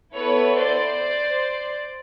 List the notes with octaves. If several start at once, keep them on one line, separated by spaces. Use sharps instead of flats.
B3 E4 A4 B4 C#5
C5 D5